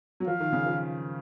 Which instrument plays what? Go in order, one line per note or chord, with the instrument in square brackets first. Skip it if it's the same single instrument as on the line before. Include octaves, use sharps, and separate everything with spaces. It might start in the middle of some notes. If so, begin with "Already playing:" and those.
[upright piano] F#3
[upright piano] F3 [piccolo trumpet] F5
[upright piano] D#3
C#3
F3